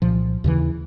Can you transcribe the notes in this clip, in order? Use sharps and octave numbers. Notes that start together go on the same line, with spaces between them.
C2 A#2 F3
D#2 C#3 E3